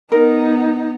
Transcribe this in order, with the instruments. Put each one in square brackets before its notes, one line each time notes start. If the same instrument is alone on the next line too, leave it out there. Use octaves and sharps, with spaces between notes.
[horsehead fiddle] B3 D#4 [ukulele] A#4